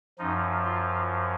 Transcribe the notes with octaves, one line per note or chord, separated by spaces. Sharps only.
F#2 F3 D#4
F4